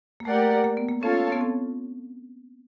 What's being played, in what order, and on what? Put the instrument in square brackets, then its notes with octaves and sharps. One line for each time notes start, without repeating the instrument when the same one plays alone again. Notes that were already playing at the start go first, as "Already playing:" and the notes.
[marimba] A#3
[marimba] A3 [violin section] G4 A#4 D5 F#5
[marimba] A#3
B3
A#3
[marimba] C#4 [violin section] F4 A4 C#5 F5 A5
[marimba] B3
C4